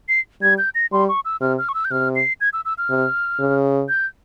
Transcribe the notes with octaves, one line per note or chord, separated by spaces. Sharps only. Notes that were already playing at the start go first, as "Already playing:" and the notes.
C7
G3 G#6
G6
A#6
G3 C6
C#6
E6
C3 F6
F6
C#6
E6
G6
C3 F6
C7
G#6
E6
E6
F6
C3
C#3
G6